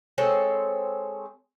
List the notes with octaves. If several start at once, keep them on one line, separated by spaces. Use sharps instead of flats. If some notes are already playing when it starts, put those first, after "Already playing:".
G#3 C4 A4 C#5